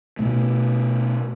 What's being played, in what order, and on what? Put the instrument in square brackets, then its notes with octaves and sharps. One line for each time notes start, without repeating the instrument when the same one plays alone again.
[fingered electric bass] B2 A3